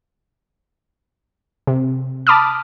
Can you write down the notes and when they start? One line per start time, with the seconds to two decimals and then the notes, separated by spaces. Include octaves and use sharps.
1.67 C3
2.27 A5 B5 D6 D#6 F6